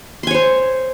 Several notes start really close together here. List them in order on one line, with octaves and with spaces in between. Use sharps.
C6 G#5 C#5 C5